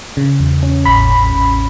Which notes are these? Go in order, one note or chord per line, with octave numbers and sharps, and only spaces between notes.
C#3
E2
C#4
A1 B5
A1
A1